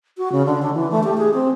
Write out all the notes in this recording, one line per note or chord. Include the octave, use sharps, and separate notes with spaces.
F#4
C#3
D3
D4
E3
A3
G4
G#4
C4